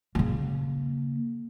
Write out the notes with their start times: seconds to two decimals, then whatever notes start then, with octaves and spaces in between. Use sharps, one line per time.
0.15 C#3 A#3